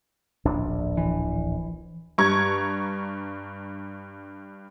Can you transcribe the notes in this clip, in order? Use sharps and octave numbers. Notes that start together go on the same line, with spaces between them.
D1 A#1 D4
E3
G2 A#5 C#6 G#6